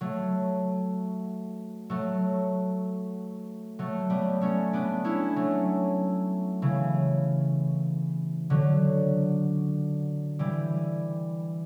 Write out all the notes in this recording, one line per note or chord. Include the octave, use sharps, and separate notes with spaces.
F#3 A3
F#3 A3
F#3 A3
G3 B3
A3 C#4
B3 D4
C#4 E4
F#3 A3
C#3 E3
D3 F#3
E3 G3